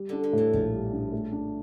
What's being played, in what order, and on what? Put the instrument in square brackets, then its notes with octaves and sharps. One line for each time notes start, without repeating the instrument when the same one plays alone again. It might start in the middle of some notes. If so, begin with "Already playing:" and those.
Already playing: [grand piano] G3
[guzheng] D3 [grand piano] D4
[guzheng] D3
[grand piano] A2 [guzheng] E3
[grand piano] A#1 [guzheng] F3
[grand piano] G3
D4
A3
D4